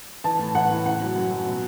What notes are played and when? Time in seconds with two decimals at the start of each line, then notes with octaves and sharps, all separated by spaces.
0.24 E3 A5
0.39 A2
0.55 E3 F#5
0.70 A2
0.85 C#3 F#5
1.01 F#3
1.15 F#2
1.31 F#2
1.46 B2